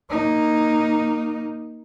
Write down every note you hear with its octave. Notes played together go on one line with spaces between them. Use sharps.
A#3 D#4